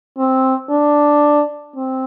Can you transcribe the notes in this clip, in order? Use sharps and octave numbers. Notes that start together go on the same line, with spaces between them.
C4
D4
C4